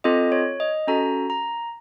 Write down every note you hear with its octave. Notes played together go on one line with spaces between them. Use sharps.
C4 F4 A4 D#5
C#5
D#5
C#4 F#4 A4 A#5
A#5